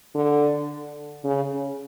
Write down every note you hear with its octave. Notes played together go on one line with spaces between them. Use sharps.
D3
C#3